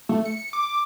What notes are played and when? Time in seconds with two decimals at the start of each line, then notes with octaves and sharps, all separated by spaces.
0.09 A3
0.25 C#7
0.53 D6